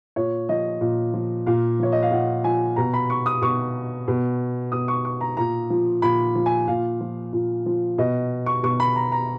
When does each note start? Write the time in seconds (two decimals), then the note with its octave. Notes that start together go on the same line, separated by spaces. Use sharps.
0.16 A#2 C#5
0.49 F3 D#5
0.81 A#2
1.14 F3
1.46 A#2 F5
1.80 F3 C#5
1.92 D#5
2.02 F5
2.11 A#2 F#5
2.44 F3 G#5
2.76 B2 A#5
2.94 B5
3.10 C#6
3.26 D#6
3.42 B2 C#6
4.08 B2
4.72 B2 D#6
4.88 C#6
5.05 C#6
5.21 A#5
5.37 A#2 A#5
5.70 F3
6.02 A#2 B5
6.35 F3
6.46 G#5
6.68 A#2 F5
7.01 F3
7.33 A#2
7.66 F3
7.98 B2 D#5
8.46 C#6
8.63 B2 C#6
8.80 B5
8.96 A#5
9.12 A#5